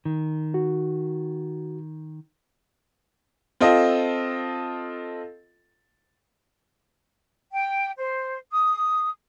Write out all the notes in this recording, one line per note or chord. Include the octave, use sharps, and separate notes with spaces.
D#3
F#4
C4 F4 A4 D#5
G5
C5
D#6